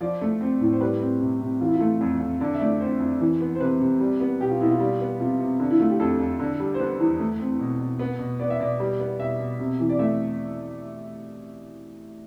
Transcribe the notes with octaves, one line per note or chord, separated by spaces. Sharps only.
F3 D5
A3
C4
A2
C5
G3 B4
C4
C3
C3
E3 F4
E4
F4
A3
F2
F2
D3 D5
E5
A3 D5
C4 C5
F2
E3
B3
C5
C3 B4
C3
G3
B3
B2 G4
F4
B2 E4
F4
G3
B3
C3 F4
C3
D3
E4
A3 F4
G4
F2 A4
F2
D3
G3
C5
B3 B4
E2
A3
C4
B2
B2
B3
B2
B3 D5
E5
B2 D5
G3
B3
B2 E5
B2
C3
E3
D5
A3 E5